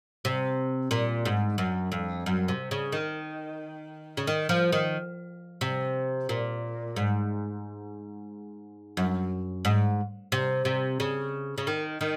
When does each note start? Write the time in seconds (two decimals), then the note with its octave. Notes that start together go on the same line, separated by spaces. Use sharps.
0.25 C3
0.91 A#2
1.25 G#2
1.58 F#2
1.92 F2
2.26 F#2
2.48 C3
2.71 C#3
2.92 D#3
4.17 C#3
4.27 D#3
4.49 F3
4.72 D#3
5.61 C3
6.29 A#2
6.96 G#2
8.97 F#2
9.65 G#2
10.32 C3
10.65 C3
11.00 C#3
11.58 C#3
11.67 D#3
12.01 D#3